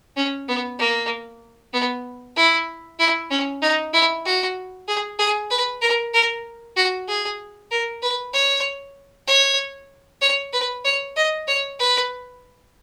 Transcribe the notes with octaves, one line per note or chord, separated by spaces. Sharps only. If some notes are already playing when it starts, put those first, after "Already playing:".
C#4
B3
A#3
B3
E4
E4
C#4
D#4
E4
F#4
G#4
G#4
B4
A#4
A#4
F#4
G#4
A#4
B4
C#5
C#5
C#5
B4
C#5
D#5
C#5
B4